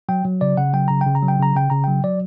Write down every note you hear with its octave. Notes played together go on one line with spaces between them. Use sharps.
F#3 G5
F#3
C#3 D5
C#3 F#5
F#3 G5
C#3 A#5
C#3 G5
A#5
F#3
G5
C#3 A#5
C#3 G5
C#3 A#5
F#3 G5
F#3 D5